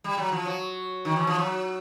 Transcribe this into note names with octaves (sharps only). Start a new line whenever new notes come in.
G3
F#3
F3
F#3
D#3
E3
F3
F#3